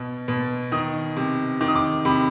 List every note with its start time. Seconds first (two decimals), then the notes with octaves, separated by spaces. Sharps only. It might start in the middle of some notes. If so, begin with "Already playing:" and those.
Already playing: B2
0.28 B2
0.72 D#3 D#6
1.17 C3
1.61 D#3 D6
1.68 D#6
1.75 D6
2.05 C3 B5